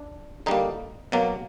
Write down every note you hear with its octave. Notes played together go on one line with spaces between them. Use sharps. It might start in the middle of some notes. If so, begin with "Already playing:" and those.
Already playing: D4
D3 G3 A#3 D#4
B2 F#3 A#3